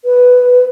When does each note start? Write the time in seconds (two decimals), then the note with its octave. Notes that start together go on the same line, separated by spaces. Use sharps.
0.05 B4